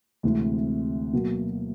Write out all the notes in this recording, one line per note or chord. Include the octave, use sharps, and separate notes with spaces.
D2 C3 E3 G#3 C4
B2 F#3 A#3